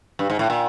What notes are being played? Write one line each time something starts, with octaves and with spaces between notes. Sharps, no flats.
G2
G#2
A2
A#2